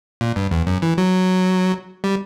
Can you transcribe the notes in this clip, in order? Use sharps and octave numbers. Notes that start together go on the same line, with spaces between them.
A#2
G2
E2
F#2
E3
F#3
G3